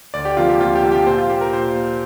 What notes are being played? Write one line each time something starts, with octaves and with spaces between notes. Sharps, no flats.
D2 D5
G4
C3 F3 A#3 F4
G4
D2 F4
G4
C3 F3 A#3
G4
A#2 C5
F4
A#3 G4
A#4
A#2 C5
A#3